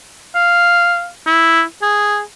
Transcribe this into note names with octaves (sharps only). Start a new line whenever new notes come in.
F5
E4
G#4